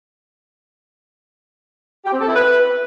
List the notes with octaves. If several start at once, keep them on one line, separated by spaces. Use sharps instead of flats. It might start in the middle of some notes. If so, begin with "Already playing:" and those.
G4
C4
A4
E4
B4